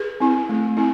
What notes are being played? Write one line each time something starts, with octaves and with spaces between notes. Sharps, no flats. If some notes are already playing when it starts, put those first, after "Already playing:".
Already playing: G#4 B4
C4 E4
A3
C4 E4